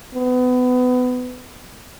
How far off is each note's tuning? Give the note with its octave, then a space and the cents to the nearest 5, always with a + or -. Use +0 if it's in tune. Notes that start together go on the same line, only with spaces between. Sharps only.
B3 +25